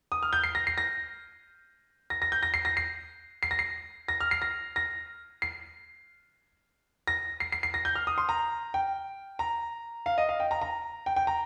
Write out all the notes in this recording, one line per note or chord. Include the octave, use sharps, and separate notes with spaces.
D#6
F6
G6
C7
A#6
C7
A#6
A#6
A#6
G6
A#6
C7
A#6
C7
C7
A#6
C7
A#6
F6
C7
A#6
A#6
C7
A#6
C7
C7
C7
A#6
G6
F6
D#6
C6
A#5
G5
A#5
F5
D#5
F5
G5
A#5
A#5
G5
G5
A#5